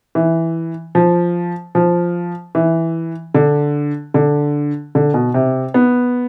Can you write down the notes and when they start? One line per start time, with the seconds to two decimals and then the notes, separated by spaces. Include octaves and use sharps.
0.15 E3
0.95 F3
1.75 F3
2.55 E3
3.35 D3
4.14 D3
4.95 D3
5.14 B2
5.34 C3
5.74 B3